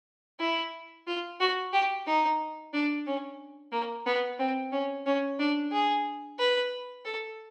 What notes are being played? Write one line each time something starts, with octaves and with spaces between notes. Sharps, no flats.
E4
F4
F#4
G4
D#4
D4
C#4
A#3
B3
C4
C#4
C#4
D4
G#4
B4
A4